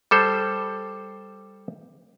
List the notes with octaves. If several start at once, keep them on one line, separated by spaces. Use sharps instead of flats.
G3 A4 C5